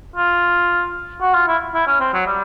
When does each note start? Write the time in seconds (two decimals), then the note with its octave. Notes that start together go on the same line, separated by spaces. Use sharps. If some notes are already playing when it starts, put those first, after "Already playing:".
0.16 F4
1.22 F#4
1.34 F4
1.48 E4
1.74 E4
1.87 C#4
2.00 C4
2.13 F#3
2.27 G3